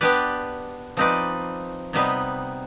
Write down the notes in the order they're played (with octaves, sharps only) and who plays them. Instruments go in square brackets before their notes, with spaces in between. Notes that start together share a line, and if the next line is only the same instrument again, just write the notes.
[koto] B3 D4 G4 B4 D5
F3 C4 D#4 B4 D5
C3 G3 B3 D#4 B4